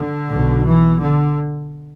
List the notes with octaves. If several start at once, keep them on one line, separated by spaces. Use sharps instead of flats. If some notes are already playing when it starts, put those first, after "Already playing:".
Already playing: D3
B1 B2
E3
D3